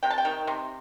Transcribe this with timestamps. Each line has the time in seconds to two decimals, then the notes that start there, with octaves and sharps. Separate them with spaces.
0.03 C3 G5
0.10 A5
0.18 G5
0.25 D#3
0.47 C3